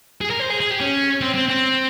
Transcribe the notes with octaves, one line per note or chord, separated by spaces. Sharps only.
G#4
A#4
C5
G#4
G#4
G4
C#4
C4
C4
C4